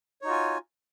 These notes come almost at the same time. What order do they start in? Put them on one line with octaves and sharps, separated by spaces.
C#5 D#4 F#4 F4 G#5